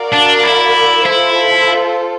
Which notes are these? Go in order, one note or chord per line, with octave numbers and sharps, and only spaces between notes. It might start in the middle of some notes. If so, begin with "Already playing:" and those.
Already playing: F#4 A#4 D5 F5
D4
E4
E4 F4 A4 C5